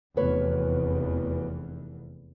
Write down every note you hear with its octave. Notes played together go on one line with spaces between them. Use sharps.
F1 E2 F#4 B4 C#5